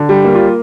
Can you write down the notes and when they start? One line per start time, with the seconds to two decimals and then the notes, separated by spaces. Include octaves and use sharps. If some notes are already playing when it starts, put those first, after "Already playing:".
Already playing: D3
0.09 G3
0.24 A#3
0.35 F4